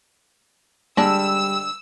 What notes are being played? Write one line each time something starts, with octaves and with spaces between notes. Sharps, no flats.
D3 G3 G#3 D4 E6